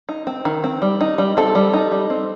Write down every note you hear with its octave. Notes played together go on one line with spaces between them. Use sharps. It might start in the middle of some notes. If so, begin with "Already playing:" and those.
D#4
C4
D#3
C4
G3
D#4
G3
C4 A4
G3
D#4
G3
C4